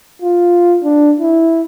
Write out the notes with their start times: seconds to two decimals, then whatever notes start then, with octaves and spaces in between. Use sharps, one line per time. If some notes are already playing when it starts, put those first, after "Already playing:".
0.22 F4
0.83 D4
1.20 E4